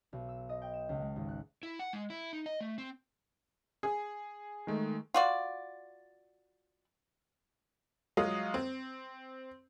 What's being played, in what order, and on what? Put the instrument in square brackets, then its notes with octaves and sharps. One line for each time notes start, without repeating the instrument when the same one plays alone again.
[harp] B1
E6
D#5
G5
E7
C#2
G#3
G#1
F#6
[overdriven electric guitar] E4
F#5
G#3
E4
D#4
D#5
A3
C4
[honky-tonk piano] G#4
[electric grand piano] D#3 G#3 A3
[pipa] F4 F#4 D5
[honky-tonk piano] F#3 G#3 F4 D#6
C4